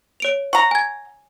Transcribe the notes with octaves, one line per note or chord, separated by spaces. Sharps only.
C#5 D7 F7
F#5 A#5 C#6
G#5 G#6